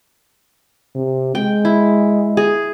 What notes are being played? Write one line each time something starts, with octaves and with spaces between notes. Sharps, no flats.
C3
G#3 G5
E4
G#4